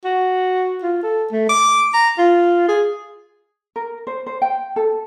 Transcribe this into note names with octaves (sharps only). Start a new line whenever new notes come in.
F#4
F4
A4
A3
D6
A#5
F4
G#4
A#4
C5
C5
G5
A4